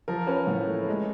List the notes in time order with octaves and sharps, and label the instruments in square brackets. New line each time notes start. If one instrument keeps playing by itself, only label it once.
[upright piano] F3 A#4
C#4 B4
A2
A3
G#3